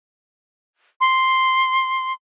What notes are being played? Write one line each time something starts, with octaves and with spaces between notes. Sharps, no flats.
C6